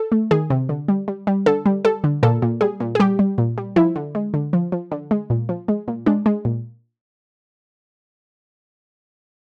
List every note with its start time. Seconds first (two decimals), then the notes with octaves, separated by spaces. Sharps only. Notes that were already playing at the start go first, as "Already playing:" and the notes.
Already playing: A4
0.12 A3
0.31 D#3 G#4
0.50 C3
0.69 D3
0.88 G3
1.08 G3
1.27 G3
1.46 D3 A4
1.66 G3
1.85 G3 A4
2.04 D3
2.23 A#2 A4
2.42 A#2
2.61 G3 G#4
2.80 A#2
2.95 G#4
3.00 G3 G4
3.19 G3
3.38 A#2
3.58 G3
3.76 F3 E4
3.96 D3
4.15 G#3
4.34 D3
4.53 F3
4.72 F3
4.92 D3
5.11 G#3
5.30 A#2
5.49 F3
5.68 G#3
5.88 A#2
6.06 G#3 D4
6.26 G#3
6.45 A#2